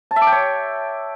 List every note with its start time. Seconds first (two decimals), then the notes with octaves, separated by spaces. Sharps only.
0.11 A5
0.16 E5
0.22 D6
0.27 G5
0.32 C#5